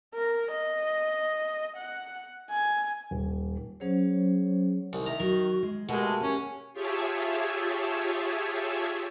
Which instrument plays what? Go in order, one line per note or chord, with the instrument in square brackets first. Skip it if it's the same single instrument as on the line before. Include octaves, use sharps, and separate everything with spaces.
[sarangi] A#4
D#5
F#5
G#5
[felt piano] D#1
[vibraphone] F#3 C#4 G#4 C5 C#5
[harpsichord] C2 [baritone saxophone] D#3
[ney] E5 [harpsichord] A#5
[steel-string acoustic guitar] F#3 [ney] F#4 [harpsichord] A#4
[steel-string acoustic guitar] G#3
[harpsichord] B2 [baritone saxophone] G#3 [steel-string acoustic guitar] A3 G4 A4 [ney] A#4
[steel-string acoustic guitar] A#3 G4 [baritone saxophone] C#4
[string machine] F4 G4 G#4 C#5 E5 A5